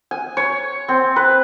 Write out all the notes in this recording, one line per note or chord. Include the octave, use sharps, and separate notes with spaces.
G#5
C#5
C4
B4